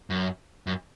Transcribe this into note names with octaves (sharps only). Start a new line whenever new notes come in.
F#2
F#2